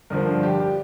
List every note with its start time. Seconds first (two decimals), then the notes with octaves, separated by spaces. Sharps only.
0.10 G2 D3 F3 A#4
0.43 G4
0.60 G4